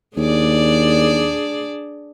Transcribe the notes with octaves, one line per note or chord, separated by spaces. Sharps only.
D#2 D4 G#4 D5